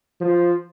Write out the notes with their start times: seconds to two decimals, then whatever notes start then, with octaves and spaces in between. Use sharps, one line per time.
0.21 F3